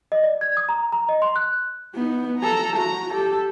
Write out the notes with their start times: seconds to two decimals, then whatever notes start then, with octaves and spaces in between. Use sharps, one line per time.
0.12 D#5
0.23 D5
0.41 G#6
0.57 D#6
0.69 A#5
0.92 A#5
1.09 D#5
1.22 C6
1.36 F#6
1.95 B3 D#4
2.39 A4 A#5
2.76 F#4 A#5
3.10 G4 A4